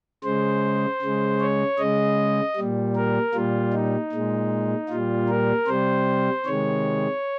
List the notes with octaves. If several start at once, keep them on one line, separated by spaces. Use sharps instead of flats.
C#3 G#3 C5
C#3 G#3
C#5
C#3 G#3 D#5
A#2 G3
A#4
A#2 G3 F4
D#4
A#2 G#3
A#2 G3 F4
A#4
C3 G3 C5
C3 D#3 G#3 C#5